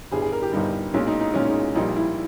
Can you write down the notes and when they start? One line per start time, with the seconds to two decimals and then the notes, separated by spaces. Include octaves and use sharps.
0.11 G1 G2 G3 G#4
0.22 G#4
0.32 A#4
0.42 G4
0.52 G1 G2 G3 D#4
0.94 B1 A#2 G#3 C#4
1.07 D#4
1.21 D#4
1.34 B1 A#2 G#3 C#4
1.49 D#4
1.75 A#1 A#2 G3 D#4
1.96 E4